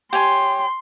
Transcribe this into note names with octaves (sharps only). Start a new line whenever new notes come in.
G4 C#5 G#5 C6